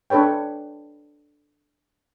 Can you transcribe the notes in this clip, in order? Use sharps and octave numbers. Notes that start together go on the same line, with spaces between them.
D4 A4 B4 C#5 G5